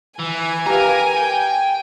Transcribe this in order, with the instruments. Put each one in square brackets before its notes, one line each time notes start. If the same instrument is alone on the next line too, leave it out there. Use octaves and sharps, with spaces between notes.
[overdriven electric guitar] E3 [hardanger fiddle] G#5
[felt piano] G4 B4 F5 [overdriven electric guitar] A#4 A#5
[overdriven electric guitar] G5